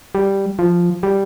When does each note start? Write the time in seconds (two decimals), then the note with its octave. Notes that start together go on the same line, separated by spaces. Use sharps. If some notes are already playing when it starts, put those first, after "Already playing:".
0.15 G3
0.59 F3
1.03 G3